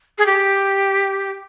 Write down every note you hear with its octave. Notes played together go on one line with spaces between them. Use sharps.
G#4
G4